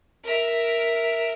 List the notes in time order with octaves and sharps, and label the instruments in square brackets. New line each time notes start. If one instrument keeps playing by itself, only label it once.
[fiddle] A#4 E5